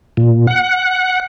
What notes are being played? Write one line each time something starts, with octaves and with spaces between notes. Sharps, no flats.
A#2
F#5